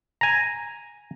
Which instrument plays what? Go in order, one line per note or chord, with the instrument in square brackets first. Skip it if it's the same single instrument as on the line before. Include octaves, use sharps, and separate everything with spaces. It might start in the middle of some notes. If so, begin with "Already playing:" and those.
[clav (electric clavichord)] G#5 A#5